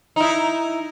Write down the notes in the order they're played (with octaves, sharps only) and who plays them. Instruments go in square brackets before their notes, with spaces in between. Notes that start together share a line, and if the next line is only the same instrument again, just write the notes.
[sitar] D#4 E4